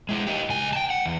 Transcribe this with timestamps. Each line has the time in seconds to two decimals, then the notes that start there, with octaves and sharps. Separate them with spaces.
0.09 G#3 E4
0.27 D#4 G4
0.49 C#2 G#5
0.73 G5 A5
0.90 F#5
1.06 E2